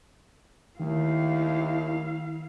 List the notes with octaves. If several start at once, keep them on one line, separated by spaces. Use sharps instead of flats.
D#2 D#3 A3 E4 F5